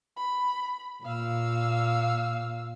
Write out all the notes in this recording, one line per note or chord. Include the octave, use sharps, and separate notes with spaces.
B5
A#2 F5 E6